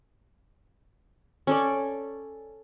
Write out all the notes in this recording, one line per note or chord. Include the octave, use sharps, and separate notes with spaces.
C#4 A4 D5